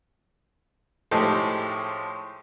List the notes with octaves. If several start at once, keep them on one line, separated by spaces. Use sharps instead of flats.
A2 F3 G#3 D#4 G4 A4